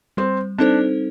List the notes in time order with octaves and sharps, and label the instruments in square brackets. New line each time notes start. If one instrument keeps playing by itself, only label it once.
[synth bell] G3 [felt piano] C4
[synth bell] C4 D#4 A4 C5 [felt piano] D4